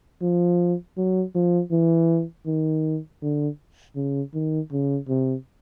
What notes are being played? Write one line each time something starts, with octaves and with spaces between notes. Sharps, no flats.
F3
F#3
F3
E3
D#3
D3
C#3
D#3
C#3
C3